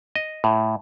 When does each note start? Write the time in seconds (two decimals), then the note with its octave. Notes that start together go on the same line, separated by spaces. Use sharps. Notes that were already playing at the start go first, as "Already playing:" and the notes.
0.15 D#5
0.44 A2